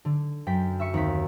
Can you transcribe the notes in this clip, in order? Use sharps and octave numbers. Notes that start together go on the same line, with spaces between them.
D3
F#2 G5 B6
E5 C#6 C#7
D#2 C4 B6